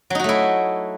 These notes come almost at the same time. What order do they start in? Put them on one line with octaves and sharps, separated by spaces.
F#3 D#4 F#4 A3 E4